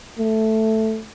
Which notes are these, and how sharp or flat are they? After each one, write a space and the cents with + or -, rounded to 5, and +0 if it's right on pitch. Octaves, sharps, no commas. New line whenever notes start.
A3 +0